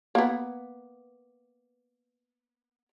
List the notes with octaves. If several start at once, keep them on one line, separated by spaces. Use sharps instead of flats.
A#3 B3